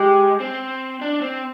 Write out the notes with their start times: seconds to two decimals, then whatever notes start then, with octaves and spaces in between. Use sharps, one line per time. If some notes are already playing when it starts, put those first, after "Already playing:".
Already playing: G#3 G4
0.40 C4
1.01 D4
1.21 C4